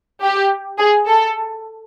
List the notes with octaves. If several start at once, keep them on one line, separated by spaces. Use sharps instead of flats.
G4
G#4
A4